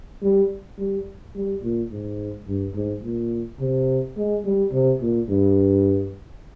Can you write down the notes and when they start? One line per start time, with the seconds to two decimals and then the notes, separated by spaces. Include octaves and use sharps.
0.23 G3
0.79 G3
1.35 G3
1.63 A#2
1.91 G#2
2.47 G2
2.75 G#2
3.03 A#2
3.60 C3
4.17 G#3
4.45 G3
4.72 C3
5.01 A#2
5.29 G2